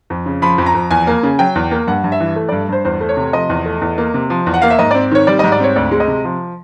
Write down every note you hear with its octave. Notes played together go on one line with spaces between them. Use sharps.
F2
C#3
F3 B5
F2
A#5
F2
E2 G#5
A#3
C#3
F#3 G5
E2
A#3
G2 F#5
G2
E5
E3
A3
G2 D5
G2 C5
E2 C5
A3
C#5
C3
F3 D#5
E2
A3
E2
A#3
C3
F3
E2
F#5
A#3 F5
E5
G#2 D#5
C4 D5
D#3 C#5
G3 D5
G#2 D#5
D5
C4 C#5
D2 D5
G#3
D#5
C3
F3